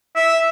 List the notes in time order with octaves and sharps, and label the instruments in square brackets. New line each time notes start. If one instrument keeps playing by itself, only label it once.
[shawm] E5